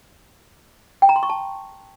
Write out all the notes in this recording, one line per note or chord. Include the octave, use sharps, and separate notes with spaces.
G5
A#5
C6
C#6
A5